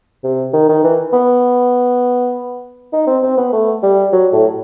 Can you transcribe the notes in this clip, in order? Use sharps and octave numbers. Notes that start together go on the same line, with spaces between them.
C3
D#3
D#3
E3
B3
D#4
C4
C4
B3
A3
G3
F#3
A2